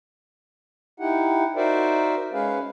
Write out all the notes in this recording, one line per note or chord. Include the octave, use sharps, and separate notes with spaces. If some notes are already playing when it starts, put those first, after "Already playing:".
D#4 E4 G4 F#5
D#4 F#4 A#4 C5 D5 E5
G#3 C#4 G#4 B4 F5